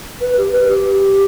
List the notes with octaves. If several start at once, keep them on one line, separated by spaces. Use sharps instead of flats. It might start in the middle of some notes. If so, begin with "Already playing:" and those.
B4
G4
B4
G4